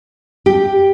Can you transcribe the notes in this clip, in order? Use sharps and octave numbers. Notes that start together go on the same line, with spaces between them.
G4